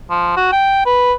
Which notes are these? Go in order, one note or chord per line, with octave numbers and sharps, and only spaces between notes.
F3
F#4
G5
B4